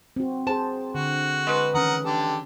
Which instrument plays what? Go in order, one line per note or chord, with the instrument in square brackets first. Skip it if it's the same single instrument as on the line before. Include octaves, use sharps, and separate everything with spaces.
[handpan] C4 F#4
[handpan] G#4 C5 [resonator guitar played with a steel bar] A5
[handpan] D3 [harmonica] F#4
[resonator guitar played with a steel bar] G#3 B4
[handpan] D#3 E3 C#4 [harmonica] A#4 F#5 D#6
[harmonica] D3 G4 A4